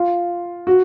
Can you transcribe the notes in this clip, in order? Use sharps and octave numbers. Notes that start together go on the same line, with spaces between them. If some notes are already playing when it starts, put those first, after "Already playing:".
Already playing: F4
F#4